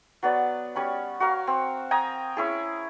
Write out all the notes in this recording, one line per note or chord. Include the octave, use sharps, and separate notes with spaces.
F#3 B3 D5
G3 C#4 B5
F#4 A#4 F5
C4
G5 G#5 A#5 D#6
C#4 E4 G#4